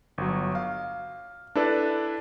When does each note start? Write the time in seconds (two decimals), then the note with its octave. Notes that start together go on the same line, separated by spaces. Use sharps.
0.18 G1 F#3
0.55 F5
1.55 D4 E4 A4 B4 D5